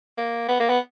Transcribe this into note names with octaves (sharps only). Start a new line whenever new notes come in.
A#3
B3
A#3
B3